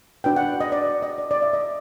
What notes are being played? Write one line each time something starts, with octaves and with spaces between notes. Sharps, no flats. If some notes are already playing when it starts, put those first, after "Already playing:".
D4 F#4 B4 G5
F#5
D#5
D5
D#5
D5
D5
E5
D#5